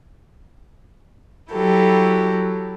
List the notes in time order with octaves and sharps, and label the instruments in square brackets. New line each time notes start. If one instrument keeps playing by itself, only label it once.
[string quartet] F#3 E4 G4 A4